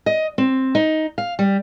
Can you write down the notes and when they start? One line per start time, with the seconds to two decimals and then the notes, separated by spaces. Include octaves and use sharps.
0.06 D#5
0.38 C4
0.75 D#4
1.18 F5
1.39 G3